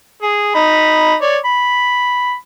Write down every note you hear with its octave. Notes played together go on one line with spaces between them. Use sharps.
G#4
D#4 B5
C#5 D5
B5